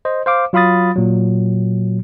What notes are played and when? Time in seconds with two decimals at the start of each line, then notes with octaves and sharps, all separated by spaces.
0.05 C5 D#5
0.26 C5 F5 D6
0.53 F#3 F4 F5 B5 D#6 A6
0.96 A#2 F#3